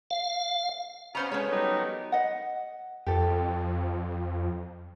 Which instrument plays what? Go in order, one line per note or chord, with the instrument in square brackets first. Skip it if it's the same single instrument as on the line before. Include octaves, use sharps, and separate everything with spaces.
[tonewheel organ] F5
[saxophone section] B3 [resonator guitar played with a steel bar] C#4 C5 A#5 [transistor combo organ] C#5 F5 B5
[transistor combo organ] G#3 [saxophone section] A3 B3 [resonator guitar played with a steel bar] C#4 C#5
[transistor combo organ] F#3 G3 A#4 [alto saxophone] D#4
[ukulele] D#5 F#5
[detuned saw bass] F2 [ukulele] G4 A4